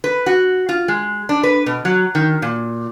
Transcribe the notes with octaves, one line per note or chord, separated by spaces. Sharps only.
B4
F#4
F4
G#3
D4
B4
B2
F#3
D#3
A#2